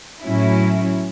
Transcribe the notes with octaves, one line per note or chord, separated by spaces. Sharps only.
A2 F#3 C#4 E4